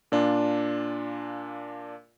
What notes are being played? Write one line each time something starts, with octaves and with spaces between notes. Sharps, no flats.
A#2 D4 F4